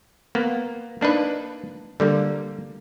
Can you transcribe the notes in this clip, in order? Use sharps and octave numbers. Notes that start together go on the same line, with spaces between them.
A#3 B3
A#3 D4 D#4 B4
D3 G3 A#3